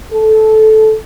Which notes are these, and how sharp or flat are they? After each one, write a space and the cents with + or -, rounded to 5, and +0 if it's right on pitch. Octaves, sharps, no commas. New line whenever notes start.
A4 -15